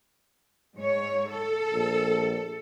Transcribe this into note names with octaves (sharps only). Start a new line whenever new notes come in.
G#2 C#5
A4
A#1